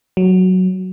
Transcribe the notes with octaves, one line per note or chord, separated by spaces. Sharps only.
F#3